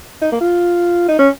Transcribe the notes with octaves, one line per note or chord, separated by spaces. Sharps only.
D#4
A#3
F4
D#4
C#4